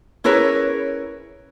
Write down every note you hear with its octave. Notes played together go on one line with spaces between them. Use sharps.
C#4 E4 G#4 A#4 B4 C#5